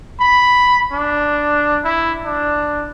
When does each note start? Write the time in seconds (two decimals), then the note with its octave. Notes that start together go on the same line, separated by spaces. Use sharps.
0.20 B5
0.92 D4
1.84 E4
2.25 D4